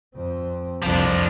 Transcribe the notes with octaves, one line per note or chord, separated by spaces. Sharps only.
F2 C4
C2 F2 F3 D4